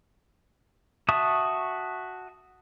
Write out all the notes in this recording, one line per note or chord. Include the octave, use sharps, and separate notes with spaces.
F#4 E5 A5 C#6 D#6